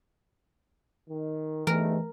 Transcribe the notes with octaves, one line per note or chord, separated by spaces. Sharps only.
D#3
E2 G2 D#3 E3 A3 A#4